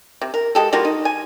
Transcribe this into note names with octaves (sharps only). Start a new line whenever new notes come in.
C3
A#4
G#3 G4 A4
G3 A#3 F4 F#4
D#4
G#5